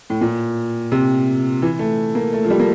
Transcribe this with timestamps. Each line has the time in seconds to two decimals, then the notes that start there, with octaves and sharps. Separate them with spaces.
0.10 A2
0.21 A#2
0.92 C3
1.62 E3
1.79 A3
2.15 A#3
2.33 A3
2.44 F3
2.50 G3
2.60 A#3